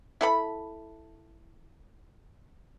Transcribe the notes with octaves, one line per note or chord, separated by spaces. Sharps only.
E4 A4 B5